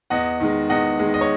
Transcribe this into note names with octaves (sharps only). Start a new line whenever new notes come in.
E2 D#5 F#5
D#3 G#3
E2 D#5 F#5
D#3 G#3
D#5
C#5